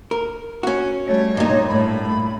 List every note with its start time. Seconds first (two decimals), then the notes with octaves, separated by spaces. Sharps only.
0.11 A#4
0.63 C#4 F#4
1.06 G3 A3 C#5
1.37 G2 A#2 D#4
1.68 A2 A3 B5